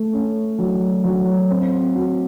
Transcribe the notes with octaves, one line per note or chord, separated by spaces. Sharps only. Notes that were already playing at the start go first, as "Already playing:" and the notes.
Already playing: A3
C#4
F#3
F#3
C4
F#4